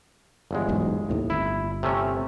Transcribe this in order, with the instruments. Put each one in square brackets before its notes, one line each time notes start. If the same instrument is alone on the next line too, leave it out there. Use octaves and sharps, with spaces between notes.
[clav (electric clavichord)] G1 E2 G#3
[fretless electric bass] E1 B1 G#2
D#2 A2 C3
[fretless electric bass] G1 [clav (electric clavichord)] E4
[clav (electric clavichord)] C3 A3 C#4